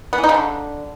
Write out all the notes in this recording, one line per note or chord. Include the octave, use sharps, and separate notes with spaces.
B3
E3
D#4
C#3
D3